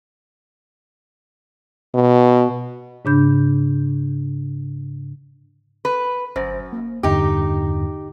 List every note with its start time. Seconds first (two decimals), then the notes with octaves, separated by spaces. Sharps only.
1.95 B2
3.05 G#2 C#3 D4 B5 G6
5.85 B4
6.36 G1 F#2 C5 A#6
6.73 A#3
7.03 E2 G2 D3 D#4 G4